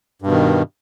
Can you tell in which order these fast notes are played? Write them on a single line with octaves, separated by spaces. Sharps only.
G2 B2 D#3